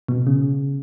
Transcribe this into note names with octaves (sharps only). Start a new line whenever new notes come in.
B2
C#3